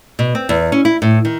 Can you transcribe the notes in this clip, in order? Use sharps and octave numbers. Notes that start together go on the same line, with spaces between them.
B2
C4
E2
C#4
E4
A2
D#3